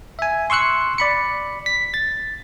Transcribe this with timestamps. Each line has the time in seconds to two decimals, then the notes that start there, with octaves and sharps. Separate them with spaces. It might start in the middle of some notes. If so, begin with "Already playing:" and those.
0.19 E5 G#5
0.50 C6 C#6 E6 F#6 C#7
0.98 D5 B5 C#7
1.66 B6
1.94 A6